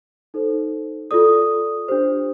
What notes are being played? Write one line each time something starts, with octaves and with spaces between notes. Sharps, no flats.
D#4 A4 C5
F4 A4 D5 D#6
D4 G4 C5